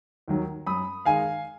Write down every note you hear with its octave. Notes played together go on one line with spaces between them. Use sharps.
D#2 D#3 F#3
F#2 B5 D#6
D#3 G#3 D#4 F5 G#5